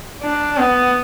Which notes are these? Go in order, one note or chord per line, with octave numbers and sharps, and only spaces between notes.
D4
B3